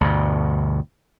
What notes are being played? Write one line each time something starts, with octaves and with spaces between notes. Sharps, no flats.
D2 G2 B2